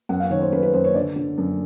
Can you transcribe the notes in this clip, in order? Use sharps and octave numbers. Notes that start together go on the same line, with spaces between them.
F#2 F#5
F5
D#3 C#5
C5
F#2 B4
B4
F#2 C5
C#5
D3 D5
D3
F#2